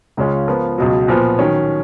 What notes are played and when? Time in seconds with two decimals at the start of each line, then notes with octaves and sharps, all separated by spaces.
0.17 C#2 C#3 G#3 C#4 F4
0.48 F3 B3 F4 A#4
0.78 C#2 B2 F#3
1.08 A#2 F3 B3
1.39 D#3 F#3 C#4